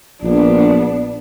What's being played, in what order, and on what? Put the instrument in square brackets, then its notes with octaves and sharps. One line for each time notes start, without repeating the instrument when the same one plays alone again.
[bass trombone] A#1 [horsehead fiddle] B3 D4